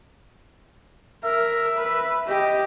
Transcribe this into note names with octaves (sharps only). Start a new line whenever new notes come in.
A#4 E5
B4
G4 D#5